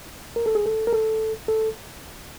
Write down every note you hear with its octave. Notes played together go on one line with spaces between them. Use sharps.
A#4
A4
G#4
A4
A#4
A4
A4